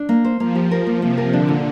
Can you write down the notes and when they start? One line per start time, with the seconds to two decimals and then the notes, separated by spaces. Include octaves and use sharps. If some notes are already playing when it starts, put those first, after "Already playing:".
Already playing: D4
0.09 A#3
0.25 C5
0.39 F3 A#3
0.55 G4
0.71 A#4
0.87 A#3
1.02 C3 A#3
1.18 A#4
1.33 D3 D4
1.48 A#2